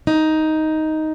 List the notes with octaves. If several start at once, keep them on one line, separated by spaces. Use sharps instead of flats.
D#4